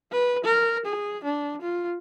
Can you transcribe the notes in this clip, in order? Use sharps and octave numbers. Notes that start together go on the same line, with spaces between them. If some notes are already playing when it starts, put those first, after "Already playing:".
B4
A#4
G#4
D4
F4